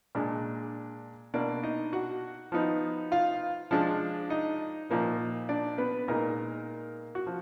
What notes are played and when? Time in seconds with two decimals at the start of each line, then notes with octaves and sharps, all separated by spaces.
0.15 A#2 G#3 D4
1.34 B2 A#3 D4 D5
1.63 D#4 D#5
1.93 F#4 F#5
2.52 F3 B3 D#4
3.12 F4 F5
3.71 F3 G#3 D4
4.30 D#4 D#5
4.90 A#2 F3 A#3 D#4
5.49 D4 D5
5.78 B3 B4
6.08 A#2 G#3 A#3 D#4 A#4
7.15 F#4
7.27 F3